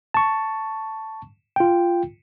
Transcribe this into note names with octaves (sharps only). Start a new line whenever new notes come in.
A5 C#6
F4 G5